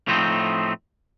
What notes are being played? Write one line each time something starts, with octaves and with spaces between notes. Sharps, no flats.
A2 F3 A3 C4 C#4 D#4